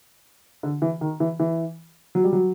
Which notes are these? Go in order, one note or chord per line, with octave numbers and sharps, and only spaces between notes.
D3
E3
D#3
E3
E3
F#3
G3
F#3